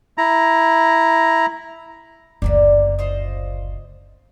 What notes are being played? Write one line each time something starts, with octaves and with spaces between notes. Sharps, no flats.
E4 A#5
F#1 D2 D3 A#3 D5
F4 C5 D#5